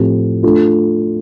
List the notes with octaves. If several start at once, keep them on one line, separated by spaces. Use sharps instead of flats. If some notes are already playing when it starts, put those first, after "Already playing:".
Already playing: A2 F3 A3 C4 G4
A3 D4 F4